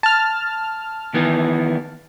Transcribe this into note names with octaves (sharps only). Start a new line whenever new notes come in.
A5 F6
D#3 E3 B3